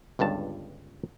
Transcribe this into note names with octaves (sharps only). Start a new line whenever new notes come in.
G1 C#2 G2 A5